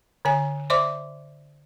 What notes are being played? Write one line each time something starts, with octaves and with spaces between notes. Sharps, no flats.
D3 C#5 G#5
C5 D5 E5 C6 D6